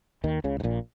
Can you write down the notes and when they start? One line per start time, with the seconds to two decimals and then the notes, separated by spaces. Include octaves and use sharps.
0.24 D#2 D#3
0.44 C#2 C#3
0.60 G#2
0.63 A#1 A#2